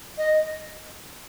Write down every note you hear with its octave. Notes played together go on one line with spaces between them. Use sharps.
D#5